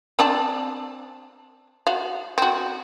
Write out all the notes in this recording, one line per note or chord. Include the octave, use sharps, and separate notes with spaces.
C4 D4 A5
F#4 F5
C4 F#4